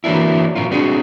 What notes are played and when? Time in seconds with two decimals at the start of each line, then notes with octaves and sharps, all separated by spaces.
0.04 E3 F#3 A#3 D4 E4
0.56 A#2 F#3 A#3 F4
0.71 B2 F#3 C4 D4 F#4 G#4